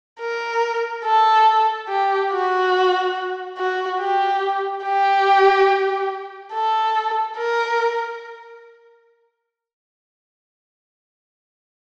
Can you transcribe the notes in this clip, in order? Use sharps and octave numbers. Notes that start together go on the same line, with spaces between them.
A#4
A4
G4
F#4
F#4
G4
G4
A4
A#4